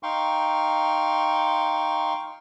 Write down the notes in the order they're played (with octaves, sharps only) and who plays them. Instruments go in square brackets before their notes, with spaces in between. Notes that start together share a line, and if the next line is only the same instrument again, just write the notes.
[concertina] D#4 F5 G5 C6 C#6